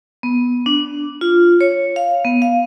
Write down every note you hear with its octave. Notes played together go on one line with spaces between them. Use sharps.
B3
D4
F4
C#5
F5
B3
F5